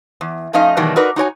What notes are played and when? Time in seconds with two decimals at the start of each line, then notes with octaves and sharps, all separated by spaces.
0.21 E2
0.53 F3 A3 C#4 D#4 D#5 F5
0.77 B2 D#3 E3 F#3 G3 A3
0.96 D#4 F#4 A#4 B4 D5
1.16 D#4 F#4 C#5 G#5